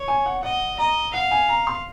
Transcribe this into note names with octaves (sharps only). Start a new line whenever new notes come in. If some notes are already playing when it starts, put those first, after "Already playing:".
Already playing: C#5
G#5
F#5
D#5 F#5
D#5 A#5
F5 F#5
G#5
A#5
C6